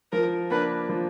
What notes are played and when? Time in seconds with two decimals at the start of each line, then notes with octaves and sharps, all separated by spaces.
0.12 F3 A#4
0.50 A#3 D4 B4
0.89 F3